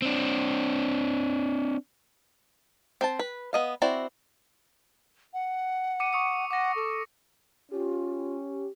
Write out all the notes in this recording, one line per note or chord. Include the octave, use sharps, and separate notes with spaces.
C4 D4
C4 C5 A5
B4
B3 D#5 F5
C4 E4 F#4 D5
F#5
D6 C#7 D#7
C#6 D#6 C#7
F#5 D6 A#6
A4
C#4 F4 G4